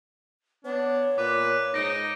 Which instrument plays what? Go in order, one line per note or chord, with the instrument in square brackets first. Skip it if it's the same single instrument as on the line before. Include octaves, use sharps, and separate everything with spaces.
[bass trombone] B3 [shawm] D4 [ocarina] C#5
[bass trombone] A#2 [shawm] B4 [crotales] D6
[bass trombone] G#2 [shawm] D#4 [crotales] A#6 D7